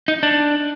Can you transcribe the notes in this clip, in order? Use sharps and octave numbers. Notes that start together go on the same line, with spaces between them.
D#4
D4